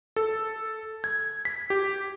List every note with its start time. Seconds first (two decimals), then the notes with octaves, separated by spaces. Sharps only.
0.16 A4
1.04 G#6
1.45 B6
1.70 G4